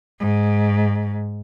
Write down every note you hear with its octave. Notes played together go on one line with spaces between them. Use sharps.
G#2